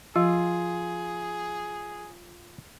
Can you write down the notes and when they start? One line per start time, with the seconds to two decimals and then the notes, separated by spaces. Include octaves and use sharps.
0.16 F3 F4 G#4